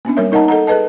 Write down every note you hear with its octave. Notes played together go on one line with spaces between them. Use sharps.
A#3 B3 C#4 D4
G3 A#3 A#4 C#5 E5
D#4 A#4 D#5 F#5 A5 A#5
A4 D#5 F#5 A#5
G#4 A4 B4 D#5 A5